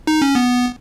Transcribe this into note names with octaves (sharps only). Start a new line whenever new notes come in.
D#4
C#4
B3